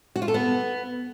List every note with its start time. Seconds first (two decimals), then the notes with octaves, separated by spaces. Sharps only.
0.16 F#4
0.22 F4
0.28 A4
0.34 B3